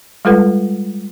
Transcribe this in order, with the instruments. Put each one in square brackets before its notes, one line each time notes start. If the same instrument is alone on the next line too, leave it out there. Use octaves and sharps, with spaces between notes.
[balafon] G3 G#3 F4 A4 B4 F#5